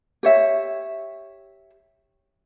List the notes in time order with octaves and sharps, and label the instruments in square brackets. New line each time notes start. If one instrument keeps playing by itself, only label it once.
[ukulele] G4 C#5 E5